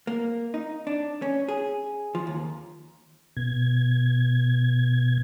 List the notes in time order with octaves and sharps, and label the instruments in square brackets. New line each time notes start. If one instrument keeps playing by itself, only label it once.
[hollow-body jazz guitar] A#3
D#4
D4
C#4
G#4
F3
D#2
[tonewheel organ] B2 G#6